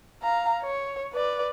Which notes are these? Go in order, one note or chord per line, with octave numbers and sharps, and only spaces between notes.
F5 A#5
C#5
B4 D5